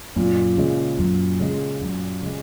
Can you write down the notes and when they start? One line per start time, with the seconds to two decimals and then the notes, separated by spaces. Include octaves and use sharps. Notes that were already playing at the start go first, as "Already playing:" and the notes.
0.16 F#2 A#2
0.58 C#3 G#3
0.99 F#2
1.40 C#3 G#3
1.82 F#2
2.22 C#3 G#3